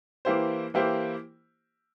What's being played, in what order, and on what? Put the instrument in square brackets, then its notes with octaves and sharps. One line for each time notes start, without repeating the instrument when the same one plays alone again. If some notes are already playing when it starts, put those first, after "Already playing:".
[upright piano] E3 A#3 E4 G4 C5
E3 A#3 E4 G4 C5